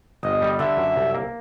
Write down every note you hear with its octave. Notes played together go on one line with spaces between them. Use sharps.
G1 D#5
G3
D3 E5
F#2
C2
A#3